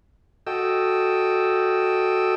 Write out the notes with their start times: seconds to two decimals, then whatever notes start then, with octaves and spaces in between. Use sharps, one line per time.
0.47 F#4 A4 D#5 G5 E6